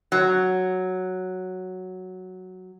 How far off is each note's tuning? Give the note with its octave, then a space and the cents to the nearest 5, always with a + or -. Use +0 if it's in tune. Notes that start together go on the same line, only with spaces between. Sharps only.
F#3 +0